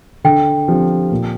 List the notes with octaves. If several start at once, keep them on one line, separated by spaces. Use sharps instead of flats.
D3 G5
F3 C4 G4
A#2